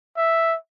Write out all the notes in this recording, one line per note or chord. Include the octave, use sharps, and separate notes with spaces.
E5